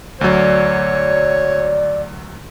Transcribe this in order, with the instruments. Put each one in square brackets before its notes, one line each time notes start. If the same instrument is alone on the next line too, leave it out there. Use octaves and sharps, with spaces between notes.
[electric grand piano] D2 F#3 [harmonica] C#5 [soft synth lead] D5